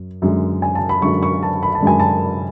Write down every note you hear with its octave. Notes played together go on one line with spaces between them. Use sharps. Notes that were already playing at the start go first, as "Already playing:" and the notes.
Already playing: F#2
F#2 D3 G#3
G#5
A5
B5
F#2 D3 G#3 C#6
C#6
A5
B5
A5
F#2 D3 G#3 G#5
A5